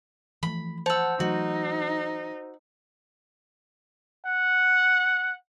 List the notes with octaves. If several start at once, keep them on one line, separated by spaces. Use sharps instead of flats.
E3 F3 A3 B5
C5 F#5 A5 E6
E3 F#3 A3 D#4 F#4
F#5